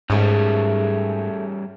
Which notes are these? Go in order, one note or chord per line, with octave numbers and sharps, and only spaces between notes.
G#2 G3 A3 C#4 G#4